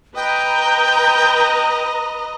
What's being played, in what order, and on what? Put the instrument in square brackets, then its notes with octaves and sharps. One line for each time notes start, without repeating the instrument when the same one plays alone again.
[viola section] B4 A#5 [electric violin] D#5 [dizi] G5